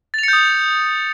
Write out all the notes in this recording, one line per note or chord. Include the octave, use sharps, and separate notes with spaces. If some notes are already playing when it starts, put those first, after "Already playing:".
D#6 G6 A6 C#7 F7